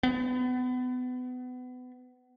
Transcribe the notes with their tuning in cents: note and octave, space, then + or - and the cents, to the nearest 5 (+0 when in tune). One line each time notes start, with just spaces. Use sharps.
B3 +30